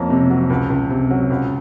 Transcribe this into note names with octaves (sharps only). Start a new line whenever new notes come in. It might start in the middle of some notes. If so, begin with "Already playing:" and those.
Already playing: F2 A#3 C#4
C3
F#3
C#2
C#2
C3
F#3
C#2